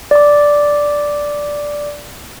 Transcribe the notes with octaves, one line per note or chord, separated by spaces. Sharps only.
D5 D6